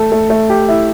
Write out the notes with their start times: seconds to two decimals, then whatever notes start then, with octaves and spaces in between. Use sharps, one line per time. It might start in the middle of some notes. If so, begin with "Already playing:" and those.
Already playing: A3 A4
0.12 A3
0.30 A3
0.50 G4
0.69 E4